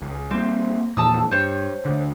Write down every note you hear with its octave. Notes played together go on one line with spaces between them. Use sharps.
C#2
G3 A#3 C4
E2 A#2 F3 A5 D#6 E6
G2 C5 C#5
D2 D3